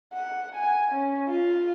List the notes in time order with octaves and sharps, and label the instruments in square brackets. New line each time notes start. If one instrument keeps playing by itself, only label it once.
[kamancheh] F#5
G#5
C#4
F4